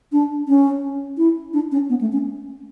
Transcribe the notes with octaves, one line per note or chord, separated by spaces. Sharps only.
D4
C#4
E4
D4
C#4
B3
A3
C#4